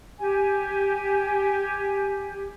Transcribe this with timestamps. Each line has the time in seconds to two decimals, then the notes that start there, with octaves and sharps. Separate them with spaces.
0.18 G4 G#5